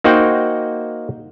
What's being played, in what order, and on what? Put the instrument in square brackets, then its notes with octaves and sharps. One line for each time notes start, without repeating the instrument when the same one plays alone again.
[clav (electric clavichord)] A#3 D#4 F#4 C5 F#5 G5